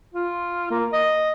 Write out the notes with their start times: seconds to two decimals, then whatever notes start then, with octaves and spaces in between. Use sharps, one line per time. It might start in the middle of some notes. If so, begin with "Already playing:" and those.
0.13 F4
0.70 A#3
0.93 D#5